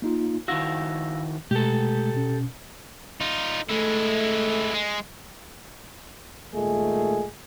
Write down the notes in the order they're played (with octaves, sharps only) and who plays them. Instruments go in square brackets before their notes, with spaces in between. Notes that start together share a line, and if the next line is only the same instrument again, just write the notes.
[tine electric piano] A#3 D#4 F4
[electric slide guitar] D#3 E4 F#4 [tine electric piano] F5 E6 A#6
[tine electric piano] B2 G#3 A3 [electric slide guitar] G4 A4
[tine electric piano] B2 C#4
[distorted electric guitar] D#4 F4
[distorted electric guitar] G#3 E4 [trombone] A3
[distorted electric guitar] G#3
[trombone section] D#2 A#2 G#3 A3 G#4